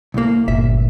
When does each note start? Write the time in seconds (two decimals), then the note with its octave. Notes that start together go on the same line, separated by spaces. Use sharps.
0.14 C2 A#3
0.48 G1 A#2 E5